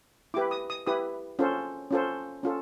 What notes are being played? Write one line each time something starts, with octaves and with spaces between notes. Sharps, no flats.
E4 G4 B4 D6
D#6
D#6
E4 G4 B4 D#6
C#4 F4 A4 C5
C#4 F4 A4 C5
C#4 F4 A4